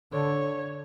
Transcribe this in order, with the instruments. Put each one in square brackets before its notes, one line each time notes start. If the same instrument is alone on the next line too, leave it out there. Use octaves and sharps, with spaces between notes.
[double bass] D3 [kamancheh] C#5